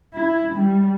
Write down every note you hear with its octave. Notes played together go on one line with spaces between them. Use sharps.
E4
G3